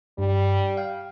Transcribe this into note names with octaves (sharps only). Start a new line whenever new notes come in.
G2 G3
F5 G5